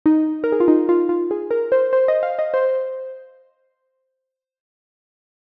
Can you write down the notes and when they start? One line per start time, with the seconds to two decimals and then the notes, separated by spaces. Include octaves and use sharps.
0.06 D#4
0.44 A#4
0.52 G#4
0.60 F4
0.68 D#4
0.89 F4
1.09 F4
1.31 G#4
1.51 A#4
1.72 C5
1.93 C5
2.08 D#5
2.23 F5
2.39 D#5
2.54 C5